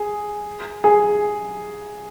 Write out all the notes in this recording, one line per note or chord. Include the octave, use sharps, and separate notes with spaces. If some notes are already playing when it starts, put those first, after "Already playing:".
Already playing: G#4
G#4